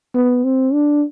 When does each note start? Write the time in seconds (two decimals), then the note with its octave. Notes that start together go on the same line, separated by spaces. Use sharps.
0.15 B3
0.44 C4
0.73 D4